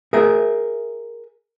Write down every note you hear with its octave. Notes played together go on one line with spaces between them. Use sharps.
G#4 A#4 E5